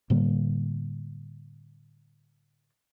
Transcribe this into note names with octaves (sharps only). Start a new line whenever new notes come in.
A2 D3 G3 A#3